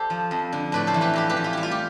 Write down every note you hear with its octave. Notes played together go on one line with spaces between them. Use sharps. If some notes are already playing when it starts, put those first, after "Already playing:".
Already playing: G4 A4 C5 D5
F3
F2
D3
A2 B4 D5
A4 C5
E3
G4 B4
F2 G4 B4
G4 B4
E3
F4
G3 G4
F4
G4